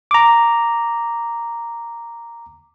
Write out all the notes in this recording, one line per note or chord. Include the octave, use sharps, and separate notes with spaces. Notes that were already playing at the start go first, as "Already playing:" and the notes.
A#5 D6